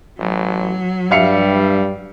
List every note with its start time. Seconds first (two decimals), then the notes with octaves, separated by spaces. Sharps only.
0.18 A1 F#3
1.11 G2 G3 E5 F5 C#7